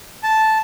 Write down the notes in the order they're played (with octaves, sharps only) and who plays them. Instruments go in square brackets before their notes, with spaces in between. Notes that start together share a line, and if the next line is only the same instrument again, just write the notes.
[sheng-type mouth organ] A5